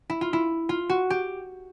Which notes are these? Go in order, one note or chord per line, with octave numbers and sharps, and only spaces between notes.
E4
F4
E4
F4
F#4
G4